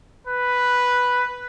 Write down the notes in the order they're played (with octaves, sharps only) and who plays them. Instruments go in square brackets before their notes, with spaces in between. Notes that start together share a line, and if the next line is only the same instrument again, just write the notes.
[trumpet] B4